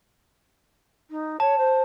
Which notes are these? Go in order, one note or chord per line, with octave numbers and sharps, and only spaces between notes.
D#4
C#5 A5
C5